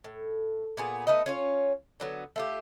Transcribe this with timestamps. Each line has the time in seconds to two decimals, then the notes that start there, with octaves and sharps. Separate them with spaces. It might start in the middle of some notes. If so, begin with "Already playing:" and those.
0.04 A2
0.77 A#2 B3 G#4
1.07 A3 B3 D#4 D#5
1.26 C#4 F4 C#5
2.00 D3 F#3 B3
2.36 A3 F4 G4